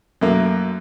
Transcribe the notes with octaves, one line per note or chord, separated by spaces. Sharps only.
F#2 A3 A#3